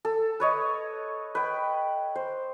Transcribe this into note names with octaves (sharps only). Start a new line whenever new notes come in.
A4
B4 C#5 D#5
B4 G5
C5